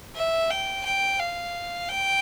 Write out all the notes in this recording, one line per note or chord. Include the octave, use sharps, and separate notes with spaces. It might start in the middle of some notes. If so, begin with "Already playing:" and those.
E5
G5
G5
F5
G5